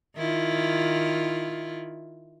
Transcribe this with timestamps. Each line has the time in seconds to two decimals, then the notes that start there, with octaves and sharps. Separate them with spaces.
0.17 D#3 E4 F4